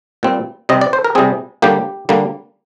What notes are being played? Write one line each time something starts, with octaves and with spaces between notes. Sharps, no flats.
A#2 G3 C4
C3 G3 C4 D#5
D5
C5
A#4
C3 G3 C4 G#4
D3 G3 A#3 G4
D3 G3 A#3